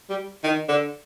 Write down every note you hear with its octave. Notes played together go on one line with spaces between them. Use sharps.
G3
D#3
D3